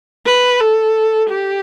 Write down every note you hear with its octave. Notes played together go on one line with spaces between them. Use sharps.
B4
A4
G4